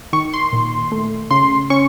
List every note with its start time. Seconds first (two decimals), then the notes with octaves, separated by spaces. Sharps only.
0.13 D#3 C#6
0.34 C6
0.53 A#2
0.92 A3
1.31 C#3 C6
1.70 C#4 C#6